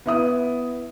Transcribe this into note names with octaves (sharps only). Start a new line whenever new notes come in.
B3 E4 D#6